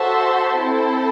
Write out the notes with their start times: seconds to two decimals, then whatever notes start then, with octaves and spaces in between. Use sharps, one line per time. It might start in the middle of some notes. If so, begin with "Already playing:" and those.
Already playing: F#4 A4 C5 E5 A5
0.57 C4 E4 A4 C5